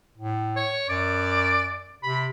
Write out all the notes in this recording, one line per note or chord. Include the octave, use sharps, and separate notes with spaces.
A2
C#5
F#2 D5
C3 B5